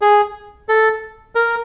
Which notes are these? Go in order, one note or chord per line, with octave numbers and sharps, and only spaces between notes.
G#4
A4
A#4